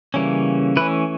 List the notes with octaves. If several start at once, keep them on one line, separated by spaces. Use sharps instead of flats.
C#3 E3 G3 A#3 C#4
E3 A3 C#4 B4